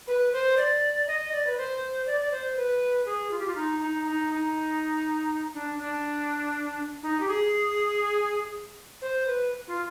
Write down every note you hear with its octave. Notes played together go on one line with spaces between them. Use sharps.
B4
C5
D5
D#5
D5
B4
C5
D5
D5
C5
B4
G#4
F4
G4
F4
D#4
D#4
D#4
D#4
D4
D4
D#4
G4
G#4
C5
B4
F4